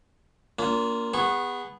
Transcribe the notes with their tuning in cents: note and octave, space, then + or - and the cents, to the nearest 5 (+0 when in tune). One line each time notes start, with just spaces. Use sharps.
A#3 -5 D4 -45 F4 -5
B3 +0 G#4 -35 C#6 -25